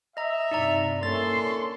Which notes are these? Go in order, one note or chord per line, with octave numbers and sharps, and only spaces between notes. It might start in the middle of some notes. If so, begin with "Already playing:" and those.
D#5 E5 A#5
G2 C3 D#4 D5 A#5
A#3 C#4 D4 E4 A4 C6 A6